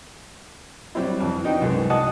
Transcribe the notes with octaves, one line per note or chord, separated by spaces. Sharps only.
F#3 G3 C4 E4
F2 E3
B3 D#4 F#4 G5
C2 F#2 G#3
F#4 D#5 F#5 G#5 A5 D#6